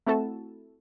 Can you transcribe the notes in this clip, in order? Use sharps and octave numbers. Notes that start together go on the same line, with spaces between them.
A3 C4 E4 F#4 A4 A5